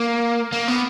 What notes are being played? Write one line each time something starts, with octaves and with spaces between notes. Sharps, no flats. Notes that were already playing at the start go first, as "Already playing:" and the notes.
Already playing: A#3
A#3
B3